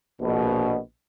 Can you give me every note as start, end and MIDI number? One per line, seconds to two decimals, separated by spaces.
0.20 0.77 34
0.20 0.77 47